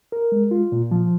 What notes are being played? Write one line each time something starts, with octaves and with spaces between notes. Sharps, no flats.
A#4
G#3
F4
A#2
F3